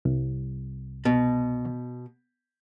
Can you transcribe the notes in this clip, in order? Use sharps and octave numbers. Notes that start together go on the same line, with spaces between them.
C2
B2